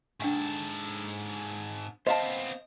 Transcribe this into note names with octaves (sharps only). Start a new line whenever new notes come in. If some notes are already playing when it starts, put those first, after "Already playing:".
G#2 D4 A4 F#5 C#6
B3 C4 C5 D#5 F5 A5